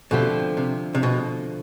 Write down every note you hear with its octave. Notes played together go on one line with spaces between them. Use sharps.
B2 D3 F3 A3 C4 G4
C3
C3
B2